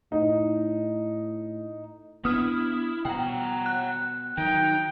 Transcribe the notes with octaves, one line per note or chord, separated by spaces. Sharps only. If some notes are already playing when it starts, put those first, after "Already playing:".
A2 D#4
B3 C4 D4 E4 D#6 F6
B2 F#5 G5 A#5
F#6
D#3 F#3 D#4 G5